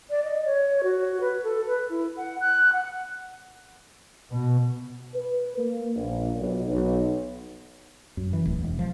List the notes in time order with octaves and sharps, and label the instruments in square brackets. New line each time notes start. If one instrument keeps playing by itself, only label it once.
[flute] D5
D#5
C#5
F#4
B4
A4
B4
E4
F#5
F#6
F#5
[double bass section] B2
[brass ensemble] B4
A#3
A#1
B1
B1
[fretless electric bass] F#2
E3
D1
E1
F3